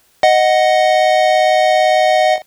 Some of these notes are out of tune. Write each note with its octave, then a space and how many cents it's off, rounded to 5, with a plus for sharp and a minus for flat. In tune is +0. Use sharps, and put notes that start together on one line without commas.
D#5 +0 F#5 +0